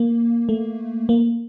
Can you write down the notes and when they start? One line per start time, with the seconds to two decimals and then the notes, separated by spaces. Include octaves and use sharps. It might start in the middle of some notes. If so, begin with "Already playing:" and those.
Already playing: A#3
0.49 A3
1.09 A#3